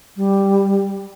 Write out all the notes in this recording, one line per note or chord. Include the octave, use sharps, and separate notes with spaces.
G3